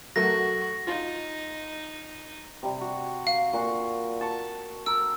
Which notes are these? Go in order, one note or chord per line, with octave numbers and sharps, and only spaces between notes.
F#3 A3 F#4 A#4 A#6
D#4 F4
C3 G3
F#4
F5
A#2 F#4 D5
A5 C#6
A#4 E6